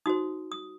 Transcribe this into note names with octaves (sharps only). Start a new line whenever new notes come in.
D#4 F#4 C5 D#6
D#6